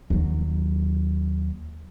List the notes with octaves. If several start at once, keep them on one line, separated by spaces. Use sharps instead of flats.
D#2 F#3